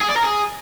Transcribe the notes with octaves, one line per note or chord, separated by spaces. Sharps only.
G#4
D5
A#4
G#4